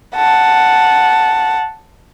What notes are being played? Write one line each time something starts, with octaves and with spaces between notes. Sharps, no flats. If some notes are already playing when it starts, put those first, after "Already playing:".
F#5 A5